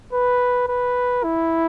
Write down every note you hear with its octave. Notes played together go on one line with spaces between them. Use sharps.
B4
B4
E4